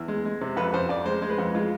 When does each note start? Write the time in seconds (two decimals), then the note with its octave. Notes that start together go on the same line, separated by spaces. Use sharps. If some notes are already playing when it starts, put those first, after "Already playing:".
Already playing: E2
0.08 G#3
0.25 G#3
0.41 C3
0.57 F2 B4
0.74 F2 C5
0.89 F2 D5
1.05 G#3 C5
1.22 G#3
1.30 B4
1.38 F2
1.55 G#3 F4